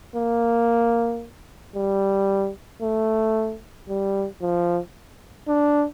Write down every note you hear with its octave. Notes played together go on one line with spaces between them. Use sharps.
A#3
G3
A3
G3
F3
D4